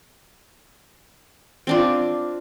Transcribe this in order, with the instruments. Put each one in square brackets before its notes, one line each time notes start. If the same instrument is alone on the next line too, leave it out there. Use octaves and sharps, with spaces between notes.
[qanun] C4 D4 F4